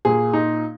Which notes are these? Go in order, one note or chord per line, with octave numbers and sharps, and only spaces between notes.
A#2 A#3 G#4
D#4